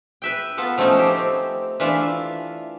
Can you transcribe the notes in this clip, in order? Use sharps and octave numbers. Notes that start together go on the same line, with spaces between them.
B4 E5 G5
B3 F4 A4
F3 A3 C#4 D#4 C#5
G4 C5
C4
E3 A3 D4 F4 E5